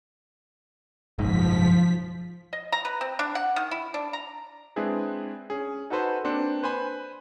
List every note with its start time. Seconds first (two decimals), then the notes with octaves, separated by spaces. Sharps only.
1.19 F#1 B1 G#2 F3 B6
2.53 D#5
2.72 A#5
2.85 B4
3.01 C4
3.19 D4
3.35 F#5
3.56 D#3
3.71 E4
3.94 D4
4.13 A#5
4.76 G#3 C4 D4 E4 G#4 B4
5.50 C#4 G#4
5.90 D#4 F#4 A4 B4 C5
6.24 A#3 C4 D4 B4 C5 C#7
6.63 B4 C5 G#5 B5